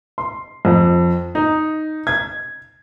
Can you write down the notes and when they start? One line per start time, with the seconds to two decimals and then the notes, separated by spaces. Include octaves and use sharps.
0.18 C6
0.65 F2
1.35 D#4
2.07 G#6